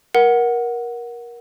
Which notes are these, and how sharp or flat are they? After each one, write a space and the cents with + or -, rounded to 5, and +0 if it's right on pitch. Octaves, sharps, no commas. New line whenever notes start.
A#4 +20 F#5 +0